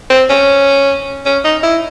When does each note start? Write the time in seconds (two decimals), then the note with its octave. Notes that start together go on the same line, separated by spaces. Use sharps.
0.10 C4
0.30 C#4
1.26 C#4
1.45 D#4
1.63 E4